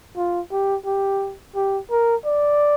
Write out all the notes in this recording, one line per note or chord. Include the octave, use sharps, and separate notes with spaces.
F4
G4
G4
G4
A#4
D5